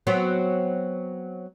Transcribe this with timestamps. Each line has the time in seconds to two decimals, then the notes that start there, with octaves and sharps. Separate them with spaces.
0.07 F#3 B3 C4